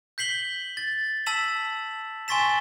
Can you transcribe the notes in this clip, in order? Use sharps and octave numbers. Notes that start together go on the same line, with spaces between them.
G6 B6 C7 F#7 G7
A6
A5 E6 B6 E7 F#7
G#5 C6 C#6 A6 B6 E7